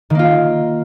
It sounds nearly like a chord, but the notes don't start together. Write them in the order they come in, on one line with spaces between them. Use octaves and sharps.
D#3 A#3 F4